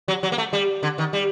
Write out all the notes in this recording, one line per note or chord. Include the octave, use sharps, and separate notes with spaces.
F#3
F#3
A#3
A3
G3
D3
D#3
G3